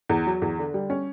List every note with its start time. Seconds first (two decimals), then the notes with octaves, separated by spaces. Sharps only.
0.09 E2
0.27 F#3
0.42 E2
0.59 D3
0.74 G3
0.90 C#4